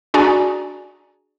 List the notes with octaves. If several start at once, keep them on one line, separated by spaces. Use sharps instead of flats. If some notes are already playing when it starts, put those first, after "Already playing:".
D4 F#4 G#4 D5 G#5 A#5